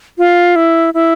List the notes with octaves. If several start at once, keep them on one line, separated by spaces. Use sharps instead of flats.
F4
E4
E4